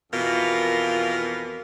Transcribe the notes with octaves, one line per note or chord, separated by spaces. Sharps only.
F2 B2 E3 F4 A#4